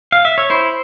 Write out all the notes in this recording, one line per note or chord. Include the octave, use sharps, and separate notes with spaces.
F5
E5
C#5
E4 C5